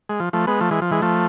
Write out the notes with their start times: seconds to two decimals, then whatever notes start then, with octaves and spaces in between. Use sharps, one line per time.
0.09 G#3
0.20 F3
0.33 F3 A3
0.47 G#3 B3
0.60 F3 A3
0.71 E3 G#3
0.82 F3
0.91 E3 G#3
1.02 F3 A3